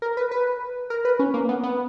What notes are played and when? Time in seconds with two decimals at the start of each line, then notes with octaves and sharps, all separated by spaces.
0.02 A#4
0.17 B4
0.31 B4
0.90 A#4
1.05 B4
1.19 C#4
1.34 A#3
1.49 B3
1.63 B3